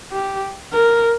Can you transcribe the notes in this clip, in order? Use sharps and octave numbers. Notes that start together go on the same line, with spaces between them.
G4
A#4